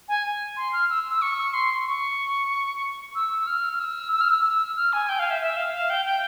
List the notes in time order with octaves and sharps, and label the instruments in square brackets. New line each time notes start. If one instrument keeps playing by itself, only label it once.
[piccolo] G#5
C6
F6
E6
E6
C#6
C6
C#6
E6
F6
E6
E6
F6
E6
F6
G#5
G5
F5
E5
E5
F5
F5
G5
G5